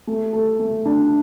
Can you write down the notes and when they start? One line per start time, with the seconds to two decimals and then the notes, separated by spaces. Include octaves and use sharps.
0.07 A3
0.33 A4
0.59 A3
0.85 D4